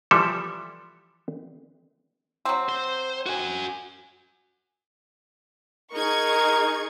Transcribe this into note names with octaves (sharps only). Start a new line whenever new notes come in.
E3 F3 G3 A4 E5
F#3 C4
C5
F#4 G#5
D#4 G#4 A#4 C#6 G#6